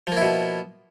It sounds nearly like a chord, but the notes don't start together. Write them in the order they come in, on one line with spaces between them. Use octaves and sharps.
F3 A#3 E4 B2